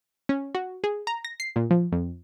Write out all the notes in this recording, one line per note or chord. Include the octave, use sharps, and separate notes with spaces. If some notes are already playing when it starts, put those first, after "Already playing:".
C#4
F#4
G#4
A#5
A#6
C7
A#2
F3
F2